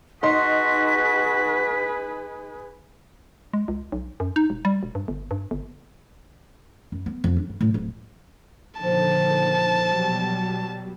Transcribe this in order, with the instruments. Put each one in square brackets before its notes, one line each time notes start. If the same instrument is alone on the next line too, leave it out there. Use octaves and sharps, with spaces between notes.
[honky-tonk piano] D#4 C6 [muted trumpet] F#4 [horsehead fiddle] G#4 B4 [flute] B6
[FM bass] G#3
C#2
B1
F#2
D#4
E1
G3
E1
G2
G1
G2
G1
[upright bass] F#2
B3
F2
D4
G2
A2
D1
[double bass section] A#2 D3 D#3 [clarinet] F3 [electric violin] A5
[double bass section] B2 F#3 G3